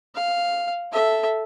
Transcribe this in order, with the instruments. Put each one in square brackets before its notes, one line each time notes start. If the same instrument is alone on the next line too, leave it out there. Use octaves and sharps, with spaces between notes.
[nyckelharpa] F5
A4 E5